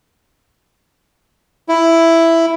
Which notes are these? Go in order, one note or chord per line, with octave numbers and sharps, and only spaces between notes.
E4